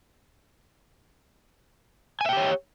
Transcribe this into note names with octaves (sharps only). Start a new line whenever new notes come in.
G4 C#5 E5 G5 G#5